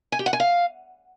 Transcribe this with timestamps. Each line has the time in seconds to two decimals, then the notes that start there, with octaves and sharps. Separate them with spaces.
0.12 G#5
0.19 G4
0.26 F#5
0.33 G#5
0.40 F5